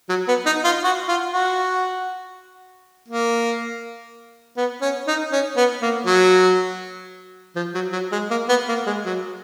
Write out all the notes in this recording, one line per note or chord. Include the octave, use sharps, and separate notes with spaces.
F#3
B3
D#4
F4
F#4
F4
F#4
A#3
B3
C#4
D#4
C#4
B3
A#3
F#3
F3
F#3
F#3
G#3
A#3
B3
A#3
G#3
F#3